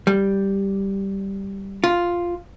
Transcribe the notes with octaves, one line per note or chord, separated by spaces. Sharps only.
G3
F4